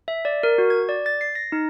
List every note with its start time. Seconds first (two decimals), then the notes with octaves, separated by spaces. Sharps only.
0.08 E5
0.25 D5
0.43 A#4
0.58 F#4
0.70 G#6
0.89 D5
1.06 A6
1.21 C7
1.35 A#6
1.52 D#4